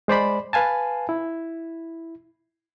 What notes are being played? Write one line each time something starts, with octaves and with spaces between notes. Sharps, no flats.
G#3 C5 D5 B5
B4 F5 G#5 A5
E4